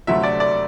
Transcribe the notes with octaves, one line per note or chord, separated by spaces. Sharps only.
D2 C3 F#3 A3 E5
D5
D5